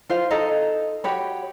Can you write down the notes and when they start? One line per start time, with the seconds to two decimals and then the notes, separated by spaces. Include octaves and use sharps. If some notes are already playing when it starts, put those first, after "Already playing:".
0.09 F4 C5 F5
0.30 D#4 A4 D#5 A#5
1.04 F#4 G4 C#5 B5